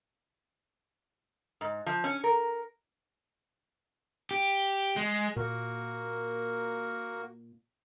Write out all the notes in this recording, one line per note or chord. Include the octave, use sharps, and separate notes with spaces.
G#2
F3
C#4
A#4
G4
G#3
A#2 A#3 F#4 A#4